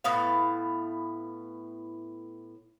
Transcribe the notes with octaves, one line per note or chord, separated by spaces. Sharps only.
A2 B3 E4 F5